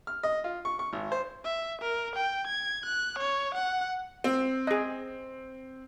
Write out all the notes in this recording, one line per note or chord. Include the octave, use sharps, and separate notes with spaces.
F6
D#5
F4
C#6
C#6
G#1
C5
E5
A#4
G5
G#6
F#6
C#5
F#5
C4
G#4 D#5